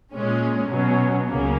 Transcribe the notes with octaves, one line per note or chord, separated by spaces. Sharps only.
A#2 G#3 C#4
B2 F#3 C#4
C#2 C#3 F#3 A#3